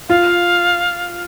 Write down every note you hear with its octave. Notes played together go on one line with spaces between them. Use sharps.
F4 F5